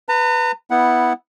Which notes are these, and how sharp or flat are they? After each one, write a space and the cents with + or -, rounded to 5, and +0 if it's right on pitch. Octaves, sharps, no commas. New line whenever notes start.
B4 +0 A#5 -40
B3 +0 E4 -15 F#5 +0